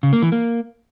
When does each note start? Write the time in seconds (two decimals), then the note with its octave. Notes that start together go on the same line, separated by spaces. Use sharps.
0.03 C#3
0.13 A#3
0.22 E3
0.32 A#3